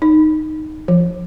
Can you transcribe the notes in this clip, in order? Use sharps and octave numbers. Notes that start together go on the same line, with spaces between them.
D#4
F3